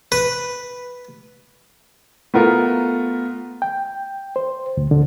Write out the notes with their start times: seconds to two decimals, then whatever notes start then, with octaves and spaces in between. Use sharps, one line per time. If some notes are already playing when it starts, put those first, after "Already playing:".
0.12 B4
2.34 A3 B3 F4 A#4
3.62 G5
4.36 C5
4.77 D2
4.91 D3